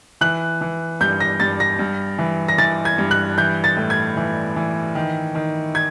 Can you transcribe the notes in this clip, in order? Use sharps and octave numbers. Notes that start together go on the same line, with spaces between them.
E3 F#6
E3
G2 G6
A#6
G2 A6
A#6
G2
E3
A#6
E3 A6
G#6
G2
F#6
E3 G6
A6
A2
G#6
E3
E3
D#3
D#3
G#6